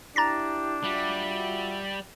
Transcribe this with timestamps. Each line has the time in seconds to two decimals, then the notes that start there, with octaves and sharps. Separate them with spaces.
0.16 D4 E4 G4 A#5 A6 A#6
0.84 G3 F4 F#4 E5